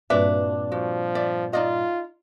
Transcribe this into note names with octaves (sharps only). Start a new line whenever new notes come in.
G2 A#2 C4 D4 F#4 B4 E5
F3 F#4
D5 E5
D#4 F4 D5 D#5